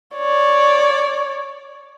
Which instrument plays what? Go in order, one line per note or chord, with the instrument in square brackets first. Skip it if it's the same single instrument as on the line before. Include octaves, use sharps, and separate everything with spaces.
[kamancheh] C#5 D5